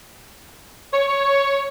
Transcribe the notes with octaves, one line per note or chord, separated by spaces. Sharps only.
C#5